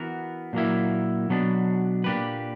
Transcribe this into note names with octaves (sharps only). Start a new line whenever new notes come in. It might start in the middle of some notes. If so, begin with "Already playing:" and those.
Already playing: E3 B3 F#4 A#4
A#2 F#3 A#3 E4
B2 F#3 B3 D4
A#2 A#3 D4 G4 B4